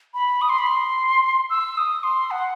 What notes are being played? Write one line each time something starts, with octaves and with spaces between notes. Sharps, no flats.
B5
D#6
C6
B5
C6
E6
D#6
C6
F#5